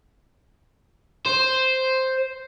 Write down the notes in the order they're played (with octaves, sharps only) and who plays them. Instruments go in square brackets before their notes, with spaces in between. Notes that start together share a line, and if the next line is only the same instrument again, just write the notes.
[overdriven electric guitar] C5